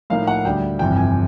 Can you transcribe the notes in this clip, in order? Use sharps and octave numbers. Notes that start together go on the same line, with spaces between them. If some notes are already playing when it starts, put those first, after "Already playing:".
A2 F3 A#3 D#4 F5
F#5
D2 D3 G3 G5
G1 F2 C3 E3 G5
G#5